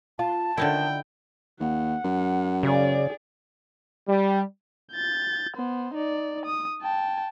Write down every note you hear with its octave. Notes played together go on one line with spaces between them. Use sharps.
F4 A5
D3 D#3 D#4 E4 G5
D#2 F#5
F#2
C#3 G#4 D5
G3
G6 A6
B3 C5
D#4 D5
D#6
G5 A5